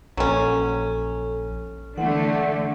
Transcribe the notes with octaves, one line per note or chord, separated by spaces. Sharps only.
A#1 F#3 C#4 A4
D3 E3 A3 F#5